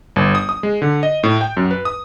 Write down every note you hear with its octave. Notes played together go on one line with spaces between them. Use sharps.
G1
D#6
D#6
G#3
D3
D#5
A2
G5
F#2
B4
D#6